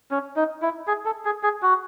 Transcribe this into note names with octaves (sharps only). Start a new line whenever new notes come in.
C#4
D#4
E4
G#4
A4
G#4
G#4
F#4